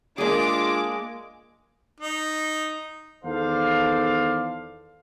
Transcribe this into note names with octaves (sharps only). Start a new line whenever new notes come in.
G#3 A#3 D4 F4 G#4 D6
D#4
E2 D#3 A4 C5 D5 F5